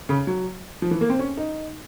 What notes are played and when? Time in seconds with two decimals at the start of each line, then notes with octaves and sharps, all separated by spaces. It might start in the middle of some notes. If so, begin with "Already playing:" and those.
0.09 C#3
0.27 F#3
0.82 F3
0.91 E3
1.01 A#3
1.10 C4
1.19 C#4
1.37 D#4